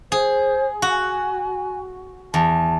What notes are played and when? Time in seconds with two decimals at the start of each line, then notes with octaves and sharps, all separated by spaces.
0.12 G#4 C5
0.82 F#4 G#5
2.34 E2 A5